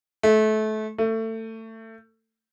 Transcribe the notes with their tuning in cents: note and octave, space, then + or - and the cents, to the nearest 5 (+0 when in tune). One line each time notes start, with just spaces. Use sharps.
A3 -25
A3 +25